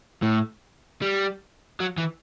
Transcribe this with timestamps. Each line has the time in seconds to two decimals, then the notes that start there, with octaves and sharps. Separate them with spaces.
0.22 A2
1.02 G3
1.80 F#3
1.98 E3